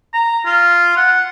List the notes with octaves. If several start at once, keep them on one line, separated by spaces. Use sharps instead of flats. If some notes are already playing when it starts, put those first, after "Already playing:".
A#5
F4
F#5